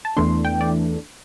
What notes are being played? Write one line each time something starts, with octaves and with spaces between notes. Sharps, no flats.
A5
E2 E3 A3 D4 C6
G5
D5